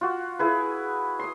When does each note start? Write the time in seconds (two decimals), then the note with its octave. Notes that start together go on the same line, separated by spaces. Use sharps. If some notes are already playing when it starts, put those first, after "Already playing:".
0.01 F4 F#4
0.39 E4 G#4 B4
1.19 C6 D#6